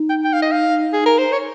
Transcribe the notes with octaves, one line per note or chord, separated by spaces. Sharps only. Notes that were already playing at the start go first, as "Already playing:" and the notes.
Already playing: D#4
G5
G5
F5
D#5
F5
G#4
A#4
C5
C#5